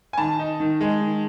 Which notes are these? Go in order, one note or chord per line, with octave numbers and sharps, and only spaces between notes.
G#5
D#3 A5
D#4
D#3
G#3
D#3